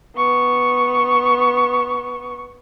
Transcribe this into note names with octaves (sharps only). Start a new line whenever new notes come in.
B3 C#6